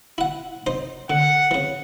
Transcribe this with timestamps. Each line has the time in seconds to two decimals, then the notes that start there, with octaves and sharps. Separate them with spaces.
0.18 E4 F#5
0.66 D#4 C5
1.10 D3 F#5
1.51 C#3 E3